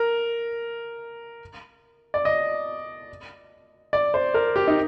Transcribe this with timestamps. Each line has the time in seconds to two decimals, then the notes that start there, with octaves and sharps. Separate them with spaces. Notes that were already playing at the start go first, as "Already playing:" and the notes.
Already playing: A#4
2.14 D5
2.25 D#5
3.93 D5
4.14 C5
4.34 A#4
4.56 G4
4.67 D#4